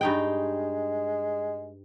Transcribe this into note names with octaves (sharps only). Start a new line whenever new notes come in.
G2 G#3 D#4 G5